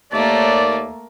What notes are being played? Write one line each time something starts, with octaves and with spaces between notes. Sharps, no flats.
D#2 A3 A#3 D5